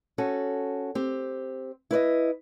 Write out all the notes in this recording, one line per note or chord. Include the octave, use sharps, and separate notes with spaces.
C#4 F#4 A4
C4 G4
E4 B4 D5 D#5